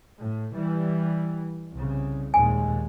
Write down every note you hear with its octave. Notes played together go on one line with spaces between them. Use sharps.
A2
E3 G3
C2 C#3
D#2 A#2 G#3 G#5